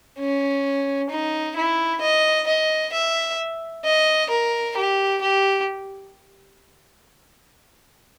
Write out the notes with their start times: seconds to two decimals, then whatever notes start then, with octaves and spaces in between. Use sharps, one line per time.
0.19 C#4
1.10 D#4
1.56 E4
2.01 D#5
2.47 D#5
2.93 E5
3.85 D#5
4.30 A#4
4.77 G4
5.21 G4